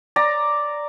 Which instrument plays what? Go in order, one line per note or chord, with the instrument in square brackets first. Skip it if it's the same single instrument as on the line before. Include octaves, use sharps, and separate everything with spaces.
[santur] D5 A#5